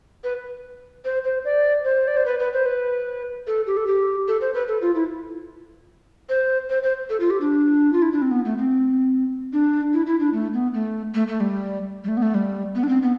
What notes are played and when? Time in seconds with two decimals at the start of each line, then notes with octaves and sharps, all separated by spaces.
0.24 B4
1.05 C5
1.25 C5
1.45 D5
1.85 C5
2.08 D5
2.17 C5
2.26 B4
2.40 B4
2.53 C5
2.66 B4
3.47 A4
3.67 G4
3.77 A4
3.87 G4
4.28 A4
4.41 C5
4.54 B4
4.68 A4
4.82 F4
4.95 E4
6.29 C5
6.70 C5
6.83 C5
7.10 A4
7.20 F4
7.30 G4
7.41 D4
7.93 F4
8.02 E4
8.12 D4
8.22 C4
8.31 B3
8.45 A3
8.58 C4
9.53 D4
9.93 E4
10.06 E4
10.20 D4
10.33 A3
10.54 B3
10.74 A3
11.14 A3
11.28 A3
11.40 G3
12.04 G3
12.08 A3
12.17 B3
12.22 A3
12.35 G3
12.75 B3
12.83 D4
12.89 C4
13.03 B3